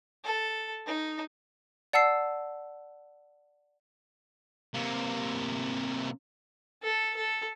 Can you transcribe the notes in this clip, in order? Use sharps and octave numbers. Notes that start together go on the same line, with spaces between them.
A4
D#4
D5 F#5 A5 E6 C7
C3 A#3
A4
A4